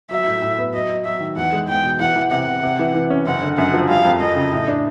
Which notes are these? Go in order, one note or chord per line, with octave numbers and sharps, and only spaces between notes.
F#3 E5
A2
A2
B3
F#3 D#5
F#3
F#3 E5
D#3
E2 F#5
G#3
E2 G5
B2
E3 F#5
E3
C3 F#5
C3
C3
E3
E3
C#4
F#1 F#5
D3
F#2 F#5
F3
G3 F5
F2
F2 D#5
C#3
A2
D4